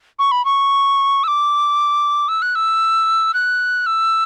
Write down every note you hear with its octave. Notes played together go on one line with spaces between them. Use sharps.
C#6
B5
C#6
E6
D6
E6
F#6
E6
F#6
E6